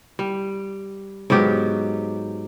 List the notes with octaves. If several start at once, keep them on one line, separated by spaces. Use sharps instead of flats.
G3
G#2 F#3 B3 G4